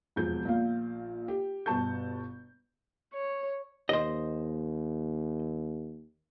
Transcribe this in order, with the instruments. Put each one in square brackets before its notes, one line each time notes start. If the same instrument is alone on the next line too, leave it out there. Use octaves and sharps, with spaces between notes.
[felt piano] E1 F2 G#4 G6
A#1 A#2 F5
G4
G1 B2 A5 C#6 G6
[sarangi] C#5
[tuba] D#2 [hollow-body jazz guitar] C5 D#5